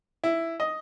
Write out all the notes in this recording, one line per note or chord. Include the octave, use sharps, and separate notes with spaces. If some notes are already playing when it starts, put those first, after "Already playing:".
E4
D#5